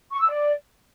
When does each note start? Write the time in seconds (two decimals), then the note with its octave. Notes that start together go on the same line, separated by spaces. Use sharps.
0.11 C#6
0.20 E6
0.29 D5